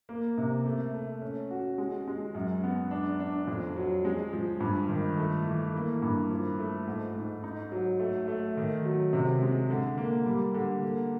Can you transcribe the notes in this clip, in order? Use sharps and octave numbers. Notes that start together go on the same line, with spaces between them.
A#3
C3
A3
A3
C#4
F#4
G#3
G#3
F#2
B3
D4
D4
F2
F#3
G#3
F3
G2
D#3
A3
E3
A#3
G2
F3
A3
G#2
G#2
D#4
F#3
A3
A3
D#3
F#3
C3
G#3
D3
A#3
G3
D3
A#3